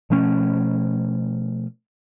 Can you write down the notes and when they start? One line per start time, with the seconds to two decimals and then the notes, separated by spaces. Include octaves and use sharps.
0.10 B2 F3 A3 C#4